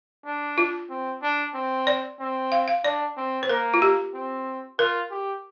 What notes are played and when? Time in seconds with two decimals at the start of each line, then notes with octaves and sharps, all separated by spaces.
0.25 D4
0.58 F4
0.90 C4
1.23 D4
1.54 C4
1.87 D5
2.20 C4
2.52 F5
2.68 F5
2.84 D4 D5
3.17 C4
3.43 C5
3.49 A#3 A#4
3.74 F4
3.82 G4
4.14 C4
4.79 F4 A#4
5.11 G4